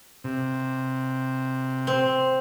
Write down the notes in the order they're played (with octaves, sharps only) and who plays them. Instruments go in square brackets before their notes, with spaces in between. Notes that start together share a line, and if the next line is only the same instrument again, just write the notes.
[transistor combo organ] C3
[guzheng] C4